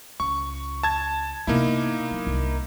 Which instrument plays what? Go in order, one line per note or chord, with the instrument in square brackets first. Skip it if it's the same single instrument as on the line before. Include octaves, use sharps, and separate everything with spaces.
[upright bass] C#2 [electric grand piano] C#6
[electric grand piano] A5 G#6
[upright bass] C3 B3 [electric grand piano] A#3 D#4 E4
[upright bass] F#3
C2 D4